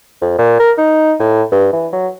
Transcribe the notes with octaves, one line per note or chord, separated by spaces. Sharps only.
F2
A#2
A#4
D#4
A2
G2
E3
F#3